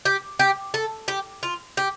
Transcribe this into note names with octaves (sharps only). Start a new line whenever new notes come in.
G4
G4
A4
G4
F4
G4